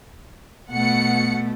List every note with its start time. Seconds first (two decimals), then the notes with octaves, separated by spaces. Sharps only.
0.71 B2 A3 F#5 C#7